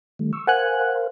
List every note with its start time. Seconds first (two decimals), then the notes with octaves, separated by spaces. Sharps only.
0.19 D#3 G3 A3
0.33 C#6 E6
0.47 A#4 C5 F5 F#5 G#5 F#6